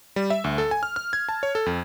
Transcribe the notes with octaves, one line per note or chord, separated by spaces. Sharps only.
G3
E5
D2
A4
G#5
F6
F6
G#6
A5
C#5
A4
F2